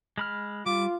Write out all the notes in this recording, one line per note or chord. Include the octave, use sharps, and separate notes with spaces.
G#3 B5 F6
G3 F4 D6